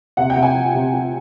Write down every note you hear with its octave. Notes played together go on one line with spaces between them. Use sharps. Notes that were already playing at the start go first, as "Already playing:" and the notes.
C3 F#5
G5
C3
G#5
F3
C3
F3